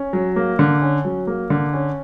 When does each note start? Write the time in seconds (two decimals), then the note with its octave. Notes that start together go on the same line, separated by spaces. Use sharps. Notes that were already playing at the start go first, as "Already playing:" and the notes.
Already playing: C#4
0.13 F#3
0.36 A#3
0.59 D3
0.82 C#4
1.05 F#3
1.27 A#3
1.50 D3
1.73 C#4